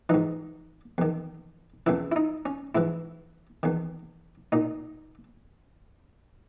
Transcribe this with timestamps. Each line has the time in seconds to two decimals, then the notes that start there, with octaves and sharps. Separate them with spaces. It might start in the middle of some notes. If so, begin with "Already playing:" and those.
0.09 G#2 E3 D#4
0.98 E2 D#3
1.86 E2 C#3 E3 E4
2.12 E4
2.16 D#4
2.46 C#4
2.75 G#2 E3 E4
3.63 E2 D#3
4.52 A#2 D#4